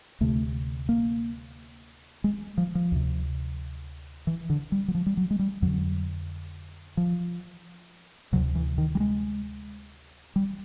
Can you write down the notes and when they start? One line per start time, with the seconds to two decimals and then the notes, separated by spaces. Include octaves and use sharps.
0.21 D2 C3 A3
0.89 A#3
2.24 G#3
2.58 F3
2.75 F3
2.92 D2 C3
4.27 E3
4.50 D3
4.72 G3
4.88 F#3
4.95 F3
5.06 G3
5.17 F#3
5.31 G#3
5.39 G3
5.62 F2 D3 F#3
6.97 F3
8.33 D2 C3 F#3
8.55 E3
8.78 D#3
8.95 G3
9.00 G#3
10.36 G3